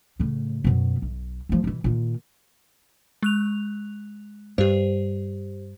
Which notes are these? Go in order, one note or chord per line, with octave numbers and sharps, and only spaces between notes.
A2 C#3
F#2 B2
B1
F3 A3
B2 E3
A#2 D#3
G#3 F#6 F7
G2 G4 C5